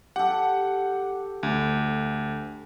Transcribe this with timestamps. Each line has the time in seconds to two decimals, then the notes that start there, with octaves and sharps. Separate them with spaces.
0.16 G4 A4 F#5
1.43 D2